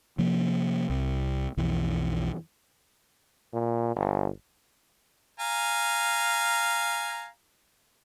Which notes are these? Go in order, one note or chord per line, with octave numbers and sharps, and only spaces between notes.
C3 F3 A#3
C2
B1 F2 E3
A#2
G1
F5 G#5 A#5